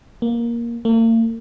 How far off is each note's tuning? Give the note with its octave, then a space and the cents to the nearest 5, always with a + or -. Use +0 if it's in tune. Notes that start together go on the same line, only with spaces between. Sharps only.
A#3 +10
A#3 -45